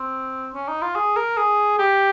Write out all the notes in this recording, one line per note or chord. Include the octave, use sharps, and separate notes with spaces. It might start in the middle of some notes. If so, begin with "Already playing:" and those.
Already playing: C4
C#4
D#4
F4
G#4
A#4
G#4
G4